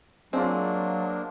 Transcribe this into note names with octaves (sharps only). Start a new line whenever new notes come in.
F#3 G#3 A#3 C4 D4 F4